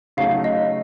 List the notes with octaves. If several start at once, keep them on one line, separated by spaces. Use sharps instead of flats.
C#3 F#3 A3 D#4 F#4 F5
D#5